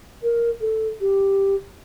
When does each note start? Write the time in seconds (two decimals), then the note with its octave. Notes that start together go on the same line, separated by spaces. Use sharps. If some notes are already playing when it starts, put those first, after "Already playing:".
0.23 A#4
0.61 A4
1.01 G4